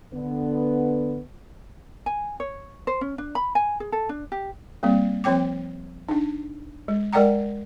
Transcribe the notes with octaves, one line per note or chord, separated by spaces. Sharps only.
D3 B3
G#5
C#5
C5
C#4
D4
B5
G#5
G#4
A4
D4
G4
G3 A#3 C4
F3 C4 C#5 G5 D6
D4 D#4
G#3
G#3 A#4 D5 F#5 G5 A#5